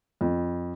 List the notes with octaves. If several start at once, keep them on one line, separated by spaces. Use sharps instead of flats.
F2